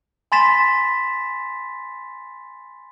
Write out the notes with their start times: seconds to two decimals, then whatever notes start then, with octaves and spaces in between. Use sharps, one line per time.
0.32 G#5 B5 C6 A6 B6 E7